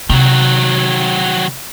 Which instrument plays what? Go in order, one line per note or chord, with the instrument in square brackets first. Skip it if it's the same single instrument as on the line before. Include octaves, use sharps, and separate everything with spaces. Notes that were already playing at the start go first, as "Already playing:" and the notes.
[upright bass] C3 [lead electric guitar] D#3 F#3